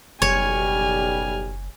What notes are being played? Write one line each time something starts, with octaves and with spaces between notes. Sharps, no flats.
F#1 B1 G3 C#5 G#5 F6